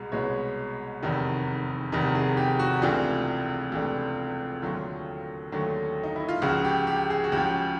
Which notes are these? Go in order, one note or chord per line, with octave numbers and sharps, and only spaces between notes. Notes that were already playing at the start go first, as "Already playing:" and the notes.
Already playing: C2 B2 G#3
C2 B2 G#3 B3 C#5
F1 E2 C3 D#3
F1 E2 C3 D#3
G#4
G4
F#4
C#2 C3 E3 A3 D4 F4
C#2 C3 E3 A3 D4
D#2 D3 F#3 A3 F4
D#2 D3 F#3 A3
D#4
E4
F4
C#2 C#3 F3 F#4
G4
G4
G#4
F#4
C#2 C#3 F3 G4